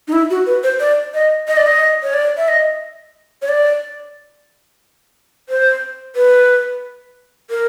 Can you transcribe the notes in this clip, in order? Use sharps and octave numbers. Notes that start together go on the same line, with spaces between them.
D#4
E4
F#4
B4
C5
D5
D#5
D#5
D5
D#5
C#5
D5
E5
D#5
C#5
D5
C5
B4
A#4